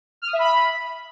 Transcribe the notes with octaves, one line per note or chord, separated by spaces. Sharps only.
F6
D#6
E5
B5